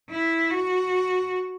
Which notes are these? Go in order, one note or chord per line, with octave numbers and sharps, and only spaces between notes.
E4
F#4